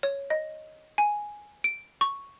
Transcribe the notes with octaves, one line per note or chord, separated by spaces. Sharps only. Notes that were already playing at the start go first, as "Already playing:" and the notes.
C#5
D#5
G#5
D7
C#6